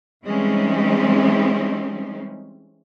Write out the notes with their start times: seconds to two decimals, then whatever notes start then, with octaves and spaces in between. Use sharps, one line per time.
0.23 E3 G3 G#3 C4 C#4 D#4